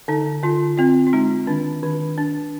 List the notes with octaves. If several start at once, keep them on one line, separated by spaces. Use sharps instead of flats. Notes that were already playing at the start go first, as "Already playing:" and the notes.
D3 D#4
D3 F4
C4 F4
F4
G#3 D#4
D#3 D4
D#3
D4